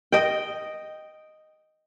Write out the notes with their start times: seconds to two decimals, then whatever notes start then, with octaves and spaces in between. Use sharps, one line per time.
0.12 D#5 G5